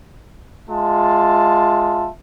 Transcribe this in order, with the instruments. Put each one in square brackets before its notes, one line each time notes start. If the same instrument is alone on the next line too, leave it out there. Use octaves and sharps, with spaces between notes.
[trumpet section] G#3 F4 E5 A5